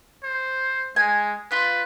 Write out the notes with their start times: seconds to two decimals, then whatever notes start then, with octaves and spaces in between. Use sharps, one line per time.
0.23 C5
0.96 G#3 G#5
1.52 F4 B4